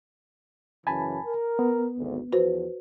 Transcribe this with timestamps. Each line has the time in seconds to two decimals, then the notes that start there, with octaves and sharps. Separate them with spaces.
0.87 F#2 C#3 E3 G#5 A5 B5
1.27 A#4
1.59 B3
1.98 G#1 D2
2.33 E2 F3 F#4 B4 C5